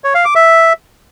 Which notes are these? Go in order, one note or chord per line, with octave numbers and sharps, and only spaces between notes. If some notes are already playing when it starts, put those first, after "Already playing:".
C#5
F5
D6
E5